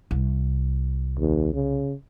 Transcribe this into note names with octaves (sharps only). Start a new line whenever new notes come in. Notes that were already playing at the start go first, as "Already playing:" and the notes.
C2
D#2
C#3